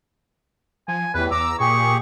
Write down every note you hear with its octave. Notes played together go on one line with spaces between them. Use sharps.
F3 G#5
E2 A2 E3 G3 B4
E2 A#5 D6 E6
A#2 G4 G#4 C#6